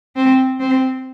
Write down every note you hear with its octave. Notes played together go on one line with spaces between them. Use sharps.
C4
C4